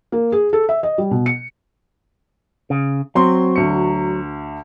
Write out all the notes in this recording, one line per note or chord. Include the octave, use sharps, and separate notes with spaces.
A#3
G#4
A4
E5
D#5
G3
B2
C#7
C#3
F#3 C4 C6
D2 C#7